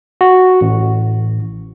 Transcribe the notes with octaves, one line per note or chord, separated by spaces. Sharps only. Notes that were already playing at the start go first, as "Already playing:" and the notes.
F#4
A1